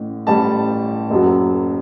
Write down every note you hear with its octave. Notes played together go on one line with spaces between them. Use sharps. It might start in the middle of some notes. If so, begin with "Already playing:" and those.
Already playing: A1 A2
A1 A2 G3 A5
F#1 F#2 F#3